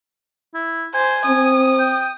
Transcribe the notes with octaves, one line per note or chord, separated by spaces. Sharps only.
E4
C5 G#5
C4 D#6
G5